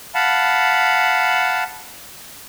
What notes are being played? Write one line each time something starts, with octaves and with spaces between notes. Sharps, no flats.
F5 F#5 A5 B5